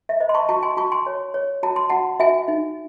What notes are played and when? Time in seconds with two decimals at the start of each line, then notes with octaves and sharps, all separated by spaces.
0.09 E5
0.20 C5 D#5
0.29 C6
0.34 A5 C#6
0.49 F#4 A5 C#6
0.63 G#5 C6
0.77 F#4 A5 C#6
0.92 G#5 C6
1.06 C#5
1.34 C#5
1.63 F#4 A5
1.76 C6
1.89 F#4 F#5 A5
2.20 F#4 E5 G#5
2.48 D#4